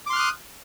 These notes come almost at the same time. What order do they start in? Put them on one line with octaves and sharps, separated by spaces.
D6 C6 F6 F#6 D#6